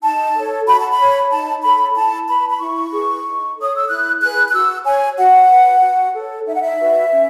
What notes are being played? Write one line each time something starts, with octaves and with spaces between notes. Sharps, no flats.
D#4 A5
A4 C#5
F#4 B5
A5
B5
C#5
D#4 A5
A4 C#5 B5
E4 A5
B4 B5
B5
E4 C#6
G#4 B4
D#4
A4 C#5 D#6
E6
E4 F#6
G#4 B4 F#6
F#6
F#4 E6
C#5 G#5
F#4 F#5
B4
F#4
A4 C#5
D#4 E5
F#5
E5
F#4 B4
C#4